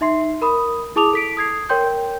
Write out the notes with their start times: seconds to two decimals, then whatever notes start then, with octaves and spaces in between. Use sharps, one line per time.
0.01 D#4 E5 C6 C7
0.42 A#4 B5 D#6
0.96 E4 G#4 A5 D6 D#6 F7
1.13 A4 B6 D7
1.37 D#6 G#6 C7
1.69 A#4 C#5 G5 C6 G6